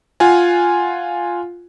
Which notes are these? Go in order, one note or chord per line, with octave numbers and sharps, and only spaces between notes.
F4 F5 F#5 G#5